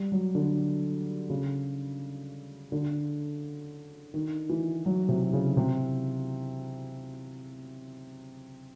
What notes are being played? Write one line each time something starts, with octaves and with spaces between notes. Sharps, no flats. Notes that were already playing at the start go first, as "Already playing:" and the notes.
Already playing: G3
F#3
D3
C#3
D3
D#3
E3
F#3
C3
C#3
C3